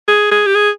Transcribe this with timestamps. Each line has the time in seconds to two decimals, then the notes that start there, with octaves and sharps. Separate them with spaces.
0.08 G#4
0.31 G#4
0.47 G4
0.55 G#4